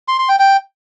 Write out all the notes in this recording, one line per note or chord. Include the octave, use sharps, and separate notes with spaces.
C6
C6
G5
G5